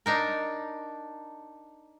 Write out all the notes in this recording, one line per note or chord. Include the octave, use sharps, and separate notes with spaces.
D4 D#4 A#4